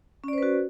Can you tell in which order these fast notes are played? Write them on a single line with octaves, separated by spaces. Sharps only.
C#4 D5 C5 B4 F#4